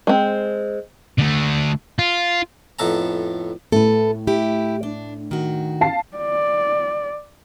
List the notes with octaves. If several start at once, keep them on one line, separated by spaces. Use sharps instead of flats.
G#3 C4
D3 A3
F4
F2 A2 B3 A4 A5 A#5
A2 A4 B4
E4 G4
D4
D#3 F#4
F5 A5 C7
D5